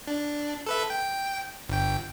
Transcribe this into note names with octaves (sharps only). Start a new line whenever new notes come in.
D4
A4 B4 E5
G5
G1 G5